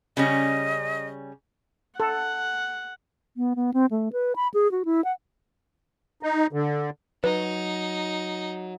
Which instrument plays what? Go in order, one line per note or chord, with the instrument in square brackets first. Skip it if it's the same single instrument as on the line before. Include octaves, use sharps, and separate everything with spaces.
[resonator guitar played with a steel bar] C#3 G3 C#4 [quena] D#5
[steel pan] A4 [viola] F#5
[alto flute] B3
B3
C4
A3
B4
B5
G#4
F#4
E4
F#5
[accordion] D#4
D3
[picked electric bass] F#3 [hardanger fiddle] D#4 [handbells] B4